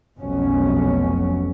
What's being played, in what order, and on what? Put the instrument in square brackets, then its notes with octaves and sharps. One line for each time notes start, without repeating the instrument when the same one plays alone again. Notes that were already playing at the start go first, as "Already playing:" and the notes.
[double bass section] F1 B1 F2 B2 F#3 C#4